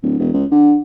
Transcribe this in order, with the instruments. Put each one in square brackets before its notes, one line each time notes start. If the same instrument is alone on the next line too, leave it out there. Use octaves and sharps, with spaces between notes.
[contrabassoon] D1
E1
C#2
D3